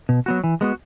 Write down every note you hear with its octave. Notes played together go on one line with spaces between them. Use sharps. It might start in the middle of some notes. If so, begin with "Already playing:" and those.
B2
F#3 B3 F#4
E3
G#3 B3 F#4